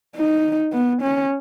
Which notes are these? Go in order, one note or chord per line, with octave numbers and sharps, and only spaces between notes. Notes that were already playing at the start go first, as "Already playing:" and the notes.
D#4
B3
C#4